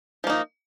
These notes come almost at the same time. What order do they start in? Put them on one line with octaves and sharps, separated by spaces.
F3 A#3 D#4